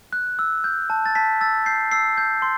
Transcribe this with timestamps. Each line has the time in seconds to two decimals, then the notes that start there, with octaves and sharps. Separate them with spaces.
0.13 F#6
0.39 E6
0.64 G6
0.90 A5
1.06 A6
1.15 A5 B6
1.41 E6 A6
1.66 G6 C7
1.92 E6 C7
2.17 G6
2.42 C6